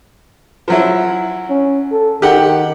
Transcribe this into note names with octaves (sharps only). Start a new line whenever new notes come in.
F3 F#3 E4
C#4
A4
D#3 G4 F#5 G5